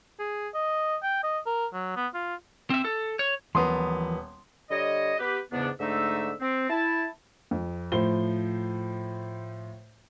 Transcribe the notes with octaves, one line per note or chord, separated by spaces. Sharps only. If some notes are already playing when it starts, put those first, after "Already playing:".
G#4
D#5
G5
D#5
A#4
F#3
B3
F4
C4 E5
A4
C#5
D#1 E3 F3 B3 A#4 C6 D#6
D3 G3 C#5 D#5
B3 G4 B4
E2 G#2 C#3 B3 D4
G#2 D3 A3 D#4 E5 E6
C4
E4 A5
F2
A2 F3 C5 G7